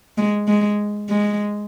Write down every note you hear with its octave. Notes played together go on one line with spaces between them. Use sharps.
G#3
G#3
G#3